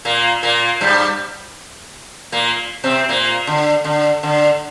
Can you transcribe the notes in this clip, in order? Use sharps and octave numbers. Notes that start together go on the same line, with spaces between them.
A#2 A#3
A#2 A#3
G2 G3
A#2 A#3
C3 C4
A#2 A#3
D3
D3
D3